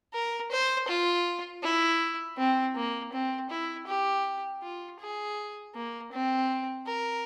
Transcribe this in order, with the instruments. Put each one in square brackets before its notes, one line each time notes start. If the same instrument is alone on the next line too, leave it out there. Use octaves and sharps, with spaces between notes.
[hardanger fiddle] A#4
C5
F4
E4
C4
A#3
C4
E4
G4
F4
G#4
A#3
C4
A#4